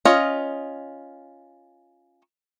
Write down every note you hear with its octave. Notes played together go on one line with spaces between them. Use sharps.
C#4 F4 D#5